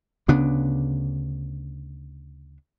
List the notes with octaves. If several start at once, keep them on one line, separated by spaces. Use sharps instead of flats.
D2 C#3 B3 D4